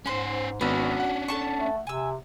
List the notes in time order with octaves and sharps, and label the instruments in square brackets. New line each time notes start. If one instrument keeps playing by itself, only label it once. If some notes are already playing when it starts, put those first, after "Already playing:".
[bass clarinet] G#2 [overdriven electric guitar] C#4 C5 [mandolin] F#5 C6
[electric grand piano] G#1 B3 [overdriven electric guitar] C#4 D4 [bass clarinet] F#4 [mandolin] B5
[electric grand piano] F#5
[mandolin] A4 A5 C#6
[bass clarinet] A3
[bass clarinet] C3 [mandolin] G#5 E6